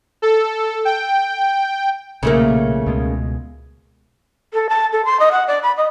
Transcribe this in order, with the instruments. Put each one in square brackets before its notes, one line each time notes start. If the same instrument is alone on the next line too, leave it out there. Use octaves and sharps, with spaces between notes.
[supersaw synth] A4
G5
[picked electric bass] B1 A#2 [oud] C#3 A3 A#3
[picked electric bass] C#2 B2 G#3
[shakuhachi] A4
A5
A4
C6
D#5
F#5
D5
B5
D#5